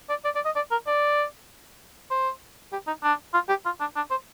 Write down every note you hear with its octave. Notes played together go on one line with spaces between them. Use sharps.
D5
D5
D5
D#5
D5
A#4
D5
C5
G4
D#4
D4
F4
G4
F4
D4
D4
C5